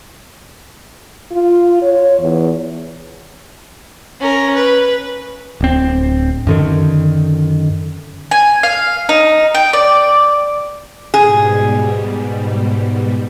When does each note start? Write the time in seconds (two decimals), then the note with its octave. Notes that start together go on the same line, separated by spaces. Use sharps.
1.32 F4
1.82 C#5
2.19 E2
4.20 C#4 A#4
4.55 B4
5.61 D1 C4
6.47 F#2 D3 D#3
8.31 G#5
8.63 F5
9.09 D#4
9.55 G5
9.73 D5
11.14 G#2 B2 G3 G#4